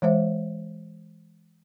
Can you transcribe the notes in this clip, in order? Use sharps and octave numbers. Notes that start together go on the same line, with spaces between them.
E3 G#3 C5 E5